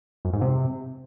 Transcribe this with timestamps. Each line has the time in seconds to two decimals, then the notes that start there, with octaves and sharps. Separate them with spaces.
0.25 F#2
0.33 G#2
0.41 C3